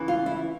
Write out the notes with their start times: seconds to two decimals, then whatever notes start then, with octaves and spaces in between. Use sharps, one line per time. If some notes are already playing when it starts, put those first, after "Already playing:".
Already playing: E2 C#3 E3
0.08 F4
0.26 E4